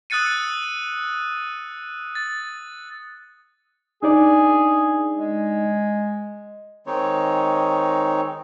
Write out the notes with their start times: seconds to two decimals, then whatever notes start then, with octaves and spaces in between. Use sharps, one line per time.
0.10 D#6 E6 F#6 A6 C#7 D#7
2.15 A6
4.03 D4 D#4 G#4 D5
5.16 G#3
6.87 D#3 G#3 C4 D#4 C#5